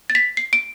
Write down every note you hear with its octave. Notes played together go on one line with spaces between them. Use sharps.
A6
B6
C7
D7